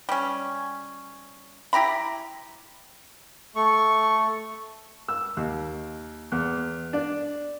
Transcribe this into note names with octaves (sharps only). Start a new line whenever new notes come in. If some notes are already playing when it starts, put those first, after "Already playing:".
G3 C#4
E4 G4 A#5 B5
A3 C#6
E6
D#2
E2
D4